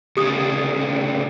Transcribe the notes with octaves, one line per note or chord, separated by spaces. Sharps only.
D2 C#3 G4 D#6